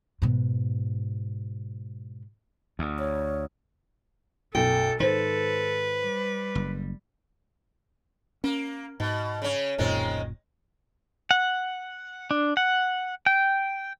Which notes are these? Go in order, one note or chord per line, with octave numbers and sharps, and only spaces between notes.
G#2 B2
D2
C#5
B1 F#2 A4 G5
G#2 D#3 A4 B4 C5
G3
F#1
A#3 C#4
G#2 B2
C#3 C#4
D1 F#2 A#2 D#3 G#3 C4
F#5
D4
F#5
G5